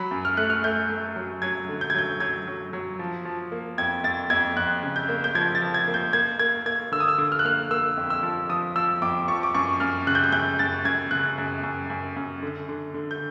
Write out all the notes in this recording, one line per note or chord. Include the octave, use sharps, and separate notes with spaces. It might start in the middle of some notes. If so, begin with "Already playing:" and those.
Already playing: F#3 B5
F#2
F6
A3 F#6
F6
A3 G6
A3
F#3
F#3 G#6
D3
G6
G#6
F#3 G6
F#3 G#6
F#3
F#3
F3
F3
A#3
F2 G#6
F2 A6
F2 G#6
F2 F#6
C#3
G6
A#3
G6
F3 G#6
A6
F3
G#6
A#3
G6
A#3 G#6
A#3 G#6
A#3 G#6
D3 E6
D#6
E6
D3
F6
F#6
A#3 F6
A#3 E6
F2
E6
F3
F3 D#6
F3 E6
F2 D6
F3 C#6
D6
F#2 C#6
F#2 F6
C#3 F#6
G6
F#6
F#2 G6
F#2 A6
F#2 G#6
C#3 F#6
F#2
F#2
F#2
F#2
D3
D3
D3
G6